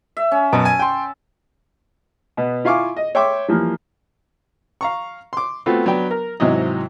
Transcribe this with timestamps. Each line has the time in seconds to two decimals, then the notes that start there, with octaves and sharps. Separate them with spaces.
0.17 E5
0.31 C#4
0.53 F#2 B2 A5
0.65 G#5
0.79 G5 C6
2.37 B2 B3
2.65 E4 F4 F5 G#5 C#6 D6
2.96 D#5
3.15 C#5 E5 G5 C6 D6
3.48 E3 F3 G3 A#3
4.81 F5 A#5 C#6
5.33 C6 D6
5.66 A3 B3 C4 F4 F#4
5.86 F#3 B3 D4 G5
6.11 A#4
6.40 G#2 C3 E3 F#3 D#5